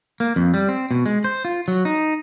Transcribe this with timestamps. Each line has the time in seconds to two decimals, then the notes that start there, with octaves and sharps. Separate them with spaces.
0.20 A#3
0.36 F2
0.54 G3
0.69 C4
0.91 B2
1.06 G#3
1.24 C5
1.45 F4
1.68 F#3
1.85 D#4